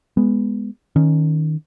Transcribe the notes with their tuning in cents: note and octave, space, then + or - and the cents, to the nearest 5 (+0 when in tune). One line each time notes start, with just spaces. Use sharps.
G#3 -5 B3 +0
D#3 +0 C#4 +0